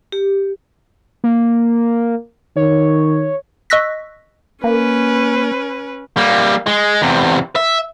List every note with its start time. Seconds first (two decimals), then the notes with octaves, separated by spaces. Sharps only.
0.12 G4
1.24 A#3
2.56 D#3 C#5
3.70 D#5 C#6 E6 F#6 A#6 B6
4.64 A#3 C#4 B4
6.17 G3 A#3
6.67 G#3
7.02 E2 C3
7.56 E5